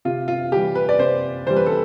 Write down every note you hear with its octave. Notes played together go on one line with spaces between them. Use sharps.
C3 F4
F4
E3 G3 G4
B4
D5
C3 C5
E3 G3 C5
B4
A4